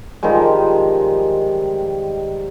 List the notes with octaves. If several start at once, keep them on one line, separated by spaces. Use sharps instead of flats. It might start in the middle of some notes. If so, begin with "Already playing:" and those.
D#3 F3 G3 G#3